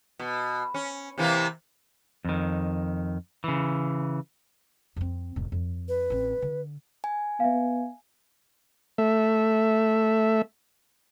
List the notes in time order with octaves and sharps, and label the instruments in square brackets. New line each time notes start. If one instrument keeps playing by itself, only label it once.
[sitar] B2
C#4
C3 E3 A#3
[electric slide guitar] F2 D#3
C#3 E3
[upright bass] F2 C4
E1 G#2
F2
[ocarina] B4
[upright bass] A1 C4
D3
[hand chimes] G#5
[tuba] B3 [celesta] E5 F5
[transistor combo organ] A3 E5